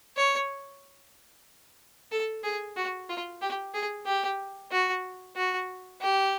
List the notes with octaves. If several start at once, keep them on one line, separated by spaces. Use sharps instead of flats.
C#5
A4
G#4
F#4
F4
G4
G#4
G4
F#4
F#4
G4